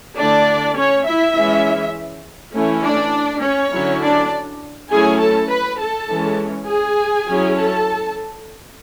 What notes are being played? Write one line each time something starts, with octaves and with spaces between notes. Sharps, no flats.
D3 A3 D4 E4 D5
C#4 C#5
E4 E5
E3 G#3 C#4 E4
E3 A3 C#4 E4
D4 D5
C#4 C#5
D3 F#3 C#4 E4
D4 D5
F#3 A3 C#4 E4 G#4 G#5
A4 A5
B4 B5
A4 A5
E3 G#3 C#4
G#4 G#5
F#3 C#4 E4
A4 A5